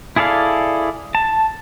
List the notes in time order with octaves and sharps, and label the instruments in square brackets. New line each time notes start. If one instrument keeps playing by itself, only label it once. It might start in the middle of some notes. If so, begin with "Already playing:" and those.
[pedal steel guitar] E4 G#4 A4 D5 F5
A5